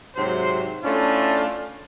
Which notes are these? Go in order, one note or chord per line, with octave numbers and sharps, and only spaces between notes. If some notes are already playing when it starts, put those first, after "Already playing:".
G#2 C3 F#3 C5
A3 C#4 D4 E4 F4